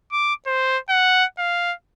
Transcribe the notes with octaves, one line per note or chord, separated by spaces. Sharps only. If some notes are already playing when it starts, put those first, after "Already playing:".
D6
C5
F#5
F5